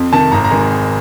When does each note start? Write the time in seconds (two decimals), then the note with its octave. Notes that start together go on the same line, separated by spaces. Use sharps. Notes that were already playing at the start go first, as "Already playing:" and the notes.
Already playing: F2
0.12 C3 D#3 A5
0.32 G#1 A#5
0.45 A#5
0.51 D#3 G#3